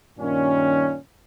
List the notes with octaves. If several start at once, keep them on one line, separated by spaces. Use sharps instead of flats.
G2 A#2 D#3 C#4